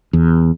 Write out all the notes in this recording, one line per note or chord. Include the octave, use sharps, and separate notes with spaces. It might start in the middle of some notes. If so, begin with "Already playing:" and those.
E2